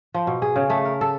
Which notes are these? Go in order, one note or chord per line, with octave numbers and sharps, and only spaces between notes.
F3
B2
G#4
C#3
A3
A#4
A4